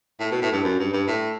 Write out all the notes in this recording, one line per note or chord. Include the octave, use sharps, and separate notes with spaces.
A2
B2
A2
G2
F#2
G2
G2
A2